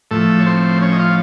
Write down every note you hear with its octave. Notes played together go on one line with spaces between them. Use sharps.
A2 F3 A3 A4
C#5
C4 C5
C#4 C#5
D#5
F4 F5